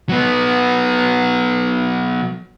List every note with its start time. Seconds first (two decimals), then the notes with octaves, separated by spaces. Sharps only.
0.09 F#3 B3